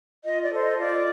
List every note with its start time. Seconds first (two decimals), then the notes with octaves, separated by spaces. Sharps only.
0.24 F4 D#5
0.42 D5
0.51 A4 C5
0.59 D#5
0.77 F4 D5